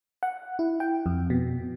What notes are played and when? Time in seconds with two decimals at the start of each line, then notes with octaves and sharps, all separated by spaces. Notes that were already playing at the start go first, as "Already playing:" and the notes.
0.23 F#5
0.59 E4
0.80 G5
1.06 F2
1.30 B2